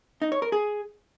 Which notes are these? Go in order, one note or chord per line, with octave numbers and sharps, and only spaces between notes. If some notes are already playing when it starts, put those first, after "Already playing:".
D#4
C#5
A#4
G#4